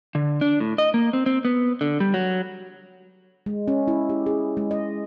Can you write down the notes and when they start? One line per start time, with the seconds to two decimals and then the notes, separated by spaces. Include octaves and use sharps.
0.15 D3
0.41 D4
0.60 A2
0.78 D#5
0.94 A#3
1.13 C4
1.26 C4
1.45 B3
1.81 D3
2.00 G3
2.14 F#3
3.46 G#3
3.68 C#4
3.88 E4
4.09 G4
4.26 G#4
4.57 G#3
4.71 D#5